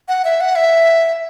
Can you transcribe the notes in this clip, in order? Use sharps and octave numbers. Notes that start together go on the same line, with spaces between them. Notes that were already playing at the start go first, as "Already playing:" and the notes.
F#5
E5
F#5
E5